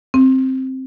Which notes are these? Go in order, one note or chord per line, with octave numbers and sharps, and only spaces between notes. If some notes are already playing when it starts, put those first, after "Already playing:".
C4